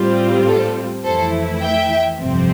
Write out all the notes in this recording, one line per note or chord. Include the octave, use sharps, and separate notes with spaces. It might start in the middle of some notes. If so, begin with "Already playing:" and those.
Already playing: A2 G3 C4 F4
A4
F2 E3 A3 E4 A4 C5
E5 G5
G1 F2 C3 F3 C4